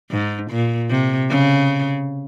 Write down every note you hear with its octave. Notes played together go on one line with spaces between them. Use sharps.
G#2
A#2
C3
C#3